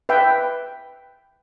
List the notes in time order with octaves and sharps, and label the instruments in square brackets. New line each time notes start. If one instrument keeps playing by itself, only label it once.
[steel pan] B4 E5 G5